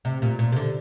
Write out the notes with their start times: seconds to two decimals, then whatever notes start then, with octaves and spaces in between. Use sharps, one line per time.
0.05 C3
0.22 A#2
0.39 A#2
0.52 C3
0.56 D3